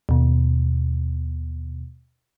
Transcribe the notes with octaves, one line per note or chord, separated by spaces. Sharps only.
D#2 B2